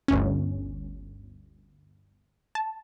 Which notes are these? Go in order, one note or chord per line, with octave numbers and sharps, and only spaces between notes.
G1 D2 C#4
A5